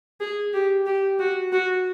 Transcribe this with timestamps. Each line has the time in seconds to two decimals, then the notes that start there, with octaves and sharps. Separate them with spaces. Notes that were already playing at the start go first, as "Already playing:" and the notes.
0.21 G#4
0.54 G4
0.86 G4
1.20 F#4
1.53 F#4